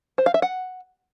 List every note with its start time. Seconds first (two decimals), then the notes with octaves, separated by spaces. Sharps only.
0.18 C5
0.26 F5
0.34 E5
0.42 F#5